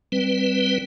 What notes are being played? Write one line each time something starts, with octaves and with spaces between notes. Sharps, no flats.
G3 C4 B4